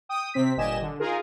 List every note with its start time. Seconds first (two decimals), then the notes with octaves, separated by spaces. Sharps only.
0.09 G5 D#6
0.34 C3 C4 B6
0.57 G1 A#2 G4 D#5 G#5 E7
0.82 D3
0.99 D#4 F4 G#4 A#4